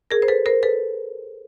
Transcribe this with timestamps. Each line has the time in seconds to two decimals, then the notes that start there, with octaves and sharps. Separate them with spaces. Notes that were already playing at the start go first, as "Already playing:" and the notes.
0.11 G#4 A#4
0.22 C5
0.28 A4 B4
0.46 A#4 C5
0.63 A4 B4